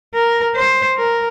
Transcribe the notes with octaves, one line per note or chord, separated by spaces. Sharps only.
A#4
C5
A#4